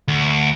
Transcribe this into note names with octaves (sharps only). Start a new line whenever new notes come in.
D2